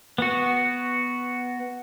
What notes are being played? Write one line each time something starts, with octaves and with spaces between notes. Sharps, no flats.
B3 F#4